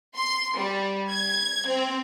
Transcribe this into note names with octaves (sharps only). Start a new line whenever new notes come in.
C6
G3
G#6
C4